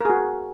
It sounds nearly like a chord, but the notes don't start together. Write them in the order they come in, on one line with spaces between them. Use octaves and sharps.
A#4 G#4 F#4